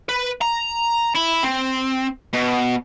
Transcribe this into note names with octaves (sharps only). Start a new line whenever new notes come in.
B4
A#5
E4
C4
B2